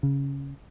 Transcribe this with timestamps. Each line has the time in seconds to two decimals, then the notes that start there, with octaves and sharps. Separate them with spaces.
0.03 C#3